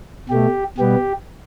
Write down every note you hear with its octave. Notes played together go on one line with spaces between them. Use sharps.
B2 A3 G4
B2 G3 B3 G4